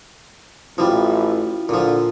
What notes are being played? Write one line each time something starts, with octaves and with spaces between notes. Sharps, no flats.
A1 F3 G3 E4 F#4
A#2 D3 F3